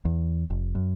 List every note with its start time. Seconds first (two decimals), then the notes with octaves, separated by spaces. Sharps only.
0.05 E2
0.50 F1
0.75 F#2